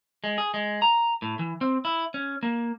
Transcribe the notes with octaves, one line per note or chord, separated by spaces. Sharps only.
G#3
G#4
G#3
A#5
A2
E3
C4
E4
C#4
A#3